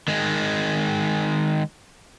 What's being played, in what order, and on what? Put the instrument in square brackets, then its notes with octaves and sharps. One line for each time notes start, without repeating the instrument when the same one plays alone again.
[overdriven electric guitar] D#3 G#3